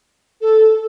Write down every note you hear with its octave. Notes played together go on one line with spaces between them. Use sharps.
A4